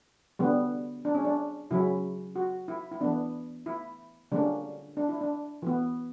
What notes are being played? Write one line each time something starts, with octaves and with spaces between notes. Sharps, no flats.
D3 G3 B3
D4
C#4
D4
C#3 F#3 C#4 E4
F#4
E4
E4
E3 B3 D4
E4
D3 G3 A#3 C#4 D4
D4
E4
D4
E3 B3